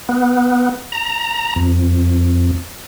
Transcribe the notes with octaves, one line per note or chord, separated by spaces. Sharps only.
B3
A#5
F2